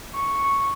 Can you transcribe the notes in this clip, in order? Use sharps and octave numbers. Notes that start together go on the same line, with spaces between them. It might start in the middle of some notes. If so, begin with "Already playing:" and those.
C#6